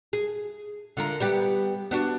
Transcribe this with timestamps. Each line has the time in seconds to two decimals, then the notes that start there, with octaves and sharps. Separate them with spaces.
0.13 G#4
0.97 D3 F4 A#4
1.20 G3 B3 G4
1.91 B3 D4 F#4